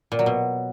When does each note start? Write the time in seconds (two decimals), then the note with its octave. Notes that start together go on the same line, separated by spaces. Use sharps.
0.12 A#2
0.19 F#3
0.26 B2